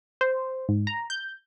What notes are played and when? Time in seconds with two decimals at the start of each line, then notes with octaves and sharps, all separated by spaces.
0.21 C5
0.69 G#2
0.87 A#5
1.10 G6